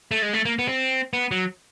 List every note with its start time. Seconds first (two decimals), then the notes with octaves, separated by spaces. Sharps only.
0.11 A3
0.22 G#3
0.33 A3
0.45 A#3
0.59 B3
0.68 C4
1.13 B3
1.31 F#3